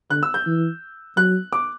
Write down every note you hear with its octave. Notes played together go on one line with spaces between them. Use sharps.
D3 F#6
E6
G6
E3
F#3 F#6
D6